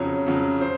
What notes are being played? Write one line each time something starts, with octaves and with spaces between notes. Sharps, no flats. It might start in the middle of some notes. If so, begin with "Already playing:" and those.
Already playing: F2 C#3 F#3 C#5
F2 C#3 F#3
C5